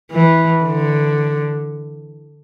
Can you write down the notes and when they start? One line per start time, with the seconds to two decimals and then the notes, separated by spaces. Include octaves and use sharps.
0.12 E3
0.64 D3